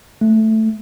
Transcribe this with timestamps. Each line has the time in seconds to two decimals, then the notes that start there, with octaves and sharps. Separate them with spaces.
0.21 A3